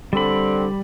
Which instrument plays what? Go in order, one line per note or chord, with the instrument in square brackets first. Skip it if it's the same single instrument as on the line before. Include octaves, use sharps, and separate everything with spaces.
[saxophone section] D3 C4 [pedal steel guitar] G3 B5